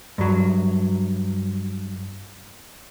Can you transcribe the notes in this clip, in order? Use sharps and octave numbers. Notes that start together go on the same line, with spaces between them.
G2 F#3